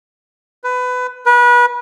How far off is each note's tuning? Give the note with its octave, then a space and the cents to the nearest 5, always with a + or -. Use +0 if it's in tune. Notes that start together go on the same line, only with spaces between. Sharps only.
B4 +20
B4 -30